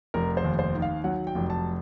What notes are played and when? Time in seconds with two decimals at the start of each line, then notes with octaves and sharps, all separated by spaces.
0.14 F1 A#4
0.37 C5
0.44 D#2
0.59 C5
0.75 D#3
0.82 F5
1.04 F#3 F#5
1.27 G5
1.35 F1
1.50 A5